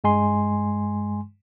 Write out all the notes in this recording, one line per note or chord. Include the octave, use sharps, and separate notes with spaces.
G2 G#3 G#5 C6